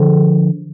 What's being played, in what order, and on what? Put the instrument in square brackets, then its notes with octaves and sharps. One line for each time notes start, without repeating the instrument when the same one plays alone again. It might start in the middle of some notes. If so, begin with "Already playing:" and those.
Already playing: [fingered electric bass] D3 F3